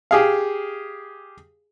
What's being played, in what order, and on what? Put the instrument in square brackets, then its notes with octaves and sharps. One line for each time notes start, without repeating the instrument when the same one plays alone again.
[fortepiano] G4 G#4 F5